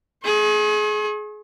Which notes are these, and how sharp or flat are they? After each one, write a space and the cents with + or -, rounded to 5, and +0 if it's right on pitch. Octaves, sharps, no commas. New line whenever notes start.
G#4 +25 C#6 -45